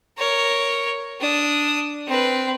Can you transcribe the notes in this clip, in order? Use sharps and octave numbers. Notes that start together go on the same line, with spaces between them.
A#4 C#5
D4 D#6
C4 B4